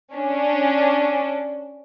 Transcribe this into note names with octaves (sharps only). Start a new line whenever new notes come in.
C#4 D4